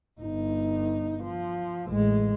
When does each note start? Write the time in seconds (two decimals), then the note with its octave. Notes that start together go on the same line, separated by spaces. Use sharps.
0.20 G1 D#4
1.24 F3
1.89 A1 G#3